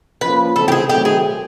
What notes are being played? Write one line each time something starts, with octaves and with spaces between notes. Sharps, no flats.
F3 A#3 C#4 F4 B4
C#3 E3 A3 C4 A4
G4
G#4
C3 D#3 F#3 A3 C4 G4
G#4